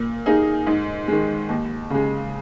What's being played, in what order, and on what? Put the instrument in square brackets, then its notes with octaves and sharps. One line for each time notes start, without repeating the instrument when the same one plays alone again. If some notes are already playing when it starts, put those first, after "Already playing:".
Already playing: [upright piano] A#2
A#3 D#4 G#4
G#2
D#3 G#3
D#2
C#3 G#3